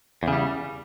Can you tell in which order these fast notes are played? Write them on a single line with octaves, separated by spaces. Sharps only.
E2 C#3 G3